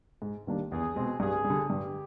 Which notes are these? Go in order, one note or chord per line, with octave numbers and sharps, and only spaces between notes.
G#2
D#3 G3 A#3 D4
E2 G#4
B2 G#3 C4
G2 G#4
G3
D3
G2 G4